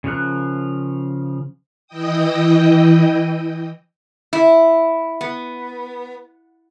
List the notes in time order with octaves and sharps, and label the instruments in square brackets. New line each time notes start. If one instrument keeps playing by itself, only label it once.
[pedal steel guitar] C#3 F3 A#4 F#6
[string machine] E3 E4 D#5 G5 D#6
[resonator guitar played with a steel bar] E4
B3